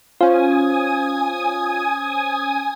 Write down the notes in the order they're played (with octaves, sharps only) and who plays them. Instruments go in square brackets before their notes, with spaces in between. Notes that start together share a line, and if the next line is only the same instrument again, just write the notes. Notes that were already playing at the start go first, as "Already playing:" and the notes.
[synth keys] C#4 C5 [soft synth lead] F4 [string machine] G#5 D#6